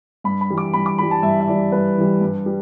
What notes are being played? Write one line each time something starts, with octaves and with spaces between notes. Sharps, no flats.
G2 B5
B5
E3 G3
D6
G2 B5
D6
E3 G3 B5
A5
G2 E5
E5
E3 G3 D5
G2 B4
E3 G3
G2
G3